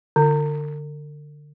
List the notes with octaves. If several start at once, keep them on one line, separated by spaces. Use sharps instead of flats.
D3